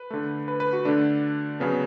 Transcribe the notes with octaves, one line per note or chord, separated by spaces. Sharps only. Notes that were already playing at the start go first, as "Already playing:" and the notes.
Already playing: B4
D3 A3
B4
B4
F#4
D3 A3 D4
C#3 F#3 B3 C#4